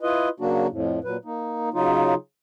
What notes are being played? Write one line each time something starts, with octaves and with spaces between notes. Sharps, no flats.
E4 F4 B4 D#5
C#3 F#3 A#3 D4 F#4
F2 A2
A#2 F#3 B4
A#3 D#4
C#3 F#3 D#4 F4